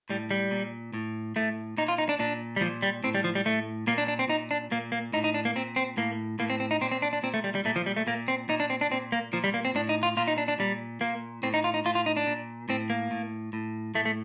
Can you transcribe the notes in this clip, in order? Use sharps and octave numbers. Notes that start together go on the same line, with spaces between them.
A2 G3
G3
A#2
A2
A2 A3
A#2 D#4
F4
D#4
D4
A#2 D4
G3
A#2 F3
G3
A2 C4
G3
F3
G3
A2 A3
A#2 A#3
D4
D4
C4
A#2 D#4
D4
A#2 A#3
A#3
A2 D#4
D#4
D4
A#3
A#2 C4
C4
A2 A#3
A2 A#3
C4
C4
D#4
A#2 C4
C4
D4
D4
A#2 C4
A3
G3
G3
A#2 A3
F3
G3
A3
A#2 A#3
C4
A#2 D#4
D4
C4
D4
A#2 C4
A#3
A#2 F3
G3
A#3
C4
A2 D4
D#4
F4
A#2 F4
D#4
D4
D4
A#2 G3
A#2 A#3
A2 C4
D#4
F4
D#4
A2 F4
F4
D#4
D4
A#2
A2 C4
A#3
A2
A2
A2 A3
A3